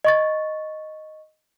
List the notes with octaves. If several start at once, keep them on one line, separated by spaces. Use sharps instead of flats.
D#5 C#6 A6